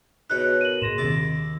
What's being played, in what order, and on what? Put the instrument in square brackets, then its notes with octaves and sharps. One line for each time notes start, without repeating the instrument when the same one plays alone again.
[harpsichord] B2 D#4 [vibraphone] G#4 B4 C#5 [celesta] F#6
[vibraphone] A#4 [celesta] D#7 F#7
[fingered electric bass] A#2 [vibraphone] G#4 C6 [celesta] A#6 E7
[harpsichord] D#2 D6 [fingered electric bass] C3 D#3 [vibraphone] E6 [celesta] A6 A#6